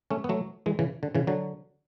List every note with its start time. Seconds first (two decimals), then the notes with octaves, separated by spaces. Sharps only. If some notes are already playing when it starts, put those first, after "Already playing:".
0.11 A3 C#4
0.24 B3
0.29 F#3 A3
0.66 E3 G#3
0.79 C#3 E3
1.03 D3
1.15 C#3 E3
1.27 D3 F#3